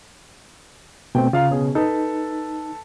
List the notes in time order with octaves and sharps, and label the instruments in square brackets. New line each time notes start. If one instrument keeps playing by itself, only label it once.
[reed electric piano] B2 A3 C4 [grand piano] G5
[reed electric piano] C#3 [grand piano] F4 F5 A#5
[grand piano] B2 C#4 G#4
[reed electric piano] D#4 [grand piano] A4 B4